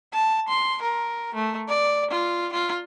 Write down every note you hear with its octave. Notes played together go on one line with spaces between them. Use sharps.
A5
C6
A#4
A3
D5
F4
F4